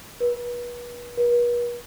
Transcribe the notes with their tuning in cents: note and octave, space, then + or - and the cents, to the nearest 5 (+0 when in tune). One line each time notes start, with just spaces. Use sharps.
B4 -35
B4 -45